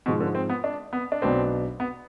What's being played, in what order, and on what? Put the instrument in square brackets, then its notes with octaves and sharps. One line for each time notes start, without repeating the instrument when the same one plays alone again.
[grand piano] G#2 F3 G#3 [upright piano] B2
[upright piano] D3
C4
B3
D4
B3
D4
[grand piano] B1 B2 B3 D4 [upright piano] C4
[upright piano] B3